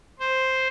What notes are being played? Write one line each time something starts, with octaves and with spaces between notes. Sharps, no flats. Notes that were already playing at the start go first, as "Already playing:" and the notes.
C5